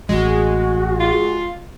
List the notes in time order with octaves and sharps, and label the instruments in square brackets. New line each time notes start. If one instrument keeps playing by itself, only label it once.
[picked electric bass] A1 [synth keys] G#3 [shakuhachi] F#4
[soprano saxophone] F4